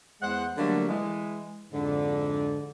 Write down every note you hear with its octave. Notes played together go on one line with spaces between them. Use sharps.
E2 G#3 C5 F#5
D3 F#3 G3 A3 A#3
E3 G#3
F2 G#2 D3